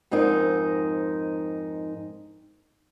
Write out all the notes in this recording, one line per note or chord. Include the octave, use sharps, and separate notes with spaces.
F2 G#2 C4 D#4 A#4